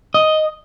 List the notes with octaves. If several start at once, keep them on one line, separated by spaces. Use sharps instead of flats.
D#5